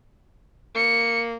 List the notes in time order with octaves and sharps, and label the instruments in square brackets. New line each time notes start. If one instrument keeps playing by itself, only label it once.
[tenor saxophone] A#3 [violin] C#7